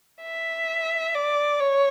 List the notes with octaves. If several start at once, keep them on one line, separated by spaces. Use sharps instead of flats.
E5
D5
C#5